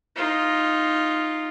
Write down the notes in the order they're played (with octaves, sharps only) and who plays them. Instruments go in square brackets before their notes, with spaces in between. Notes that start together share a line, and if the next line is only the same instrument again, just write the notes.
[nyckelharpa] D#4 F4